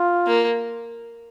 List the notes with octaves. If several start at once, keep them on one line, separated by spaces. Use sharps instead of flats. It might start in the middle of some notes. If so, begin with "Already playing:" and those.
Already playing: F4
A#3